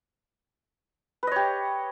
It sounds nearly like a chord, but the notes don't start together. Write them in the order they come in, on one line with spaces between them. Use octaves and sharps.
B4 D#5 C#5 G4